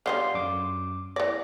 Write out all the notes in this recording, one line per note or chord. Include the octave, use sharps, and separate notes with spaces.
D3 G3 D#4 F5 C6
F#2 D6
E3 D5 A#6